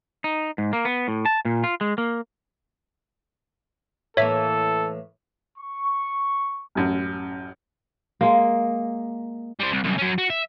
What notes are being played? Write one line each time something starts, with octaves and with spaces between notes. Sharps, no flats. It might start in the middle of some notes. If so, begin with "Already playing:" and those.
D#4
G#2
A#3
B3
A2
A5
A#2
F4
G#3
A#3
A2 E3 A#3 A4 C#5 E5
C#6
A1 F#2
G#3 A#3
G3 C5
C2
C2 F#2
F#3 C#4
F#4
E5